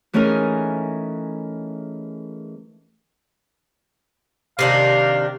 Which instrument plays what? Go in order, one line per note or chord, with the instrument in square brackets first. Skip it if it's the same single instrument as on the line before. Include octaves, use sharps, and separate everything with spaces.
[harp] E3 A3 C#4 D#4 G#4 A#4
[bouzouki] C3 D#3 D4 [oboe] F5